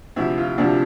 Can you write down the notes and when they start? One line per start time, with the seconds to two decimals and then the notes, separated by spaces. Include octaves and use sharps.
0.16 D2 C3 F3 E4
0.38 F4
0.58 D2 C3 F3 D4